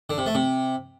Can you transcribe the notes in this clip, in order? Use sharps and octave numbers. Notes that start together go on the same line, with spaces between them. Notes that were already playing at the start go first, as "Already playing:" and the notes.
D3
C3
A3
C3